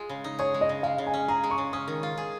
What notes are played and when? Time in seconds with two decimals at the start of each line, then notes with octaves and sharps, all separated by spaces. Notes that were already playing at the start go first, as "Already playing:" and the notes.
Already playing: G#3 F4 G#4
0.09 C#3
0.24 D#4
0.39 G#4 C#5
0.54 G#3
0.61 D#5
0.69 C#3
0.83 G#3 F5
0.98 C#3
1.07 G#5
1.14 C#4
1.28 G#4 A#5
1.44 G#3
1.51 C#6
1.58 C#3
1.73 C#4 D#6
1.88 D#3
2.03 F4
2.17 G#4